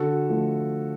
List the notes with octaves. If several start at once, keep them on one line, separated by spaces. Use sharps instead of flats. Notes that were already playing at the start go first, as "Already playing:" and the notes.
Already playing: D3 F#4 A4
F3 A3